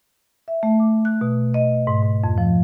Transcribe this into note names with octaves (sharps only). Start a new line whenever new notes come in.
E5
A3
D6
F#6
B2
D#5
G#2
G#2
F2
F3